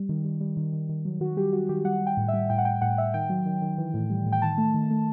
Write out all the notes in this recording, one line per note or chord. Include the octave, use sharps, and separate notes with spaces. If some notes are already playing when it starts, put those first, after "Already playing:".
Already playing: G3
D#3
G3
G3
D#3
D#3
D#3
F#3
D#3 F#4
G3 G4
G3 F#4
D#3 G4
G3 F#5
G3
G5
A2
E5
G3
A2 G5
F#5
A2 G5
A2 F#5
A2 E5
D#3 G5
F#3
D#3
D#3
E3
A2
G3
A2
G5
D#3 A5
A3
D#3
A3